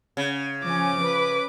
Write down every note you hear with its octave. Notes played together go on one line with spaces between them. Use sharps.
C#3
F3 C#4 D6
B4